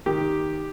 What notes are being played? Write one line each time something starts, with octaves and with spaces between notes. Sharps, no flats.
D#3 G4